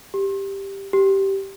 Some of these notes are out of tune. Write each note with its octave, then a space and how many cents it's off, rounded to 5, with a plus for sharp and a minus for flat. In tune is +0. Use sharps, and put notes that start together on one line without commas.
G4 +5
G4 -10